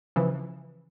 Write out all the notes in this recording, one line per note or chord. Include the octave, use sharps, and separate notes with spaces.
C#3 E3 F3